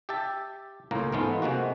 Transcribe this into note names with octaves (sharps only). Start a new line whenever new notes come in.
G4 E5 A5
C#2 A2 A#3 A#5
G#2 E3 G#3 A3 B3 F4
C3 G#3 A#3 F#4